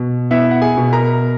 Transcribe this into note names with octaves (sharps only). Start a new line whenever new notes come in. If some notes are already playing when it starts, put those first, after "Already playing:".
Already playing: B2
B3 E4 E5
F#5
G#4 G#5
B2
A#4 A#5